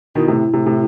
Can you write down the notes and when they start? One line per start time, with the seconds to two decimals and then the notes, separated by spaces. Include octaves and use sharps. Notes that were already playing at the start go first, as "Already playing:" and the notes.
0.15 B2 D#3 E4
0.28 A2 C3
0.53 A2 C3
0.66 A2 C3